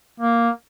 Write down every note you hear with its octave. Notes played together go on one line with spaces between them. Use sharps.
A#3